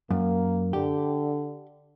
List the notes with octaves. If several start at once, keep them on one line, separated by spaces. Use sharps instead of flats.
F#2 A#3
D3 G4